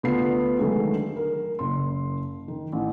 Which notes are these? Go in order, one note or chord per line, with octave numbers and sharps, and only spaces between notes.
D2 B3 F4 C7
D3 D#3 F#3 G#3 A3
A#4
F#1 C6
D#3
A1